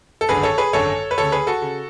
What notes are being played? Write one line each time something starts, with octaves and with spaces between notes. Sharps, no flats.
A4
G#1 F#2 D3 G#4 B4
A4 C#5
G#4 B4
G#1 F#2 D3 A4 C#5
B4
D2 C#3 A4 C#5
G#4 B4
F#4 A4
C#3